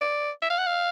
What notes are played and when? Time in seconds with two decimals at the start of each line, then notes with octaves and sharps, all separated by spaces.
0.01 D5
0.42 E5
0.50 F5
0.58 F#5
0.67 F5